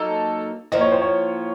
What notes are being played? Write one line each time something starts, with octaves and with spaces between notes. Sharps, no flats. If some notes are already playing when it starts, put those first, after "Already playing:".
Already playing: F#3 A#3 D#4 A4
A2 F3 A#3 F4 D#5
C#5
C5
C#5